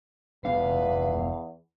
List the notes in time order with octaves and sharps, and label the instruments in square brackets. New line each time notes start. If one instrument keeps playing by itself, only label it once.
[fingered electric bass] F1 B3 D4 [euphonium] E2 [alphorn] B4 [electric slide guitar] F5